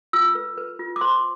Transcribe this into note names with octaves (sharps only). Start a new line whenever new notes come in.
F4 E6
B4
B4
F4
D6
C5 C6